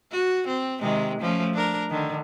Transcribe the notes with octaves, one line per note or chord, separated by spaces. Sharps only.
F#4
C4
C3 D#3 G#3
F3 A3 C#4
D4 A#4
D3 D#3